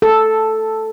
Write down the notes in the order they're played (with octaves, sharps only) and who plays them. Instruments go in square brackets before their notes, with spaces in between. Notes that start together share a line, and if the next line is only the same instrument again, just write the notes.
[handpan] A4